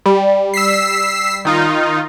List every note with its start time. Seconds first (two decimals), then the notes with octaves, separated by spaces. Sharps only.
0.06 G3
0.54 E6 B6 C7
1.45 D#3 D#4 F4